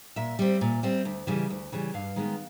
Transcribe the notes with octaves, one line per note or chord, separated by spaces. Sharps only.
A#2 E5
G3 C4
A#2
G3 C4
D2
C#3 E3 G3
D2
C#3 E3 G3
G2 F5
D#3 G#3 B3